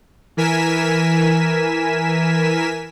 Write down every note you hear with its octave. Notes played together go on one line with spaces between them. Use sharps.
E3 A#4 G#5 B6 E7